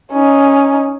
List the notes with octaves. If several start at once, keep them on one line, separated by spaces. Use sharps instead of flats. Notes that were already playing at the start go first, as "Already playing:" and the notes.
C#4 D#4